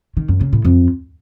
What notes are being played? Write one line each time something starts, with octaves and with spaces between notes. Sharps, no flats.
D#3
F#2
C#3
A2
F2